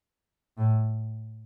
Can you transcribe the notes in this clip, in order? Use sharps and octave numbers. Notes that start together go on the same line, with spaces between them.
A2